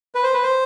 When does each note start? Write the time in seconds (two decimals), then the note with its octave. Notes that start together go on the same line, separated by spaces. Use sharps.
0.15 B4
0.24 C5
0.34 B4
0.43 C5